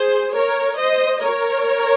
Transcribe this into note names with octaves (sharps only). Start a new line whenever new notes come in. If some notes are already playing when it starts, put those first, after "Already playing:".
Already playing: G#4 C5
A#4 C#5
C5 D#5
A#4 C#5